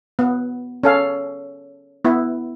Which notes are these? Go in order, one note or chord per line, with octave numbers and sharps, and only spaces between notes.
B3
C#4 A4 F5
B3 E4